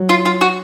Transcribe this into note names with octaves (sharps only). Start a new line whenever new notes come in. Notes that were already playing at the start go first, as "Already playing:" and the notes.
Already playing: F#3
F4
F4
F#4